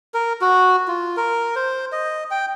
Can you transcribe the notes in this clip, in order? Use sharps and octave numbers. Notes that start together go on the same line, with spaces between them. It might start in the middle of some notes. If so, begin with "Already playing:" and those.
A#4
F#4
F4
A#4
C5
D#5
G5